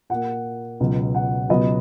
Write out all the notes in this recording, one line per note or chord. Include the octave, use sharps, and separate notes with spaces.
A#2 A#3 F#5
C#2 B2 F#3
F#5
C#2 B2 F#3 B3 D#5